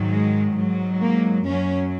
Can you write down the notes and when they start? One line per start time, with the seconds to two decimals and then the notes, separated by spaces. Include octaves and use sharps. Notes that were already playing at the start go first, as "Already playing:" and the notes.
Already playing: G#2 D#3 F#3
0.08 G#3
0.55 G#2 F#3
1.01 A#3
1.47 F#2 F#3 C#4